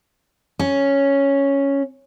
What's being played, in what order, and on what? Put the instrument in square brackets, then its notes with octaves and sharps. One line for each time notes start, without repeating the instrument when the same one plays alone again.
[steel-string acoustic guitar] C#4